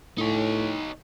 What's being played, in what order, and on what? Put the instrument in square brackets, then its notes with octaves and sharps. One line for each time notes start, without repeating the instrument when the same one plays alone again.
[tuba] A2 [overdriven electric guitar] D#4 C#5